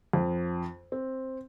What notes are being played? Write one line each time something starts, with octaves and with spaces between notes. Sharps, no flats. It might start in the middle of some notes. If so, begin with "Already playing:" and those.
F2
C4